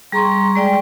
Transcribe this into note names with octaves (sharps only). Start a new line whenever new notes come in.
G3 G#4 A#5 C6 C#6
G#3 D5 G5